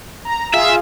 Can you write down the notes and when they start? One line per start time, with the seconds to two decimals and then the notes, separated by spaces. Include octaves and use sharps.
0.25 A#5
0.53 F4 G#4 E5 F5